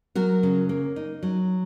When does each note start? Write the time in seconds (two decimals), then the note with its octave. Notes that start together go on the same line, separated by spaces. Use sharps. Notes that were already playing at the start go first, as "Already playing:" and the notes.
0.15 F#3 F#4 A#4
0.43 C#3
0.69 A#3
0.96 D#4
1.23 F#3